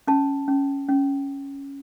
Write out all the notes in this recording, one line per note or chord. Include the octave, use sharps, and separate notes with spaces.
C#4 A5
C#4
C#4